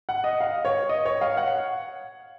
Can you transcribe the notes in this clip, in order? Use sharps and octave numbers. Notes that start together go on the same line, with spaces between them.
F#5
D#5
F5
C#5
D#5
C#5
F5
F#5